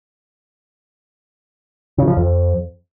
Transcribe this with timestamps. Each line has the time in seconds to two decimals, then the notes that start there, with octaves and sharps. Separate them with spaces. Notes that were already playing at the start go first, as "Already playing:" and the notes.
1.98 C#3
2.08 F3
2.17 F2